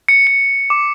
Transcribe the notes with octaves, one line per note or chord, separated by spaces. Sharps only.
C#7
C#7
D6